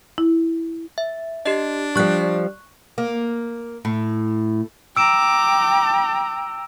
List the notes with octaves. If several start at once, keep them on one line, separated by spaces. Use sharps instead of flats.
E4
E5
D4 G4 D#5
F3 G3 C#6 F#6
A#3
A2
G5 A#5 D6 E6 D7 E7